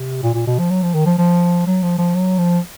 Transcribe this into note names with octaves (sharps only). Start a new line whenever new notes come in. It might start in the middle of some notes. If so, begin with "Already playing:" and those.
Already playing: C3
A#2
A#2
B2
F3
F#3
F3
D#3
F3
F3
F#3
F3
F3
F#3
F3